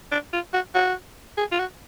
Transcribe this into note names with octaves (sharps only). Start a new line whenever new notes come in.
D4
F4
F#4
F#4
G#4
F4
F#4